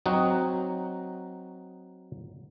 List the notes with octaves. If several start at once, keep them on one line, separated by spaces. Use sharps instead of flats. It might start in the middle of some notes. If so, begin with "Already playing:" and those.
F#3 C4 D#4 F#4